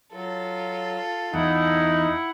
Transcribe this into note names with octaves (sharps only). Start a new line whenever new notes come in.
F#3 F4 A4
E2 D#4 E4 F#5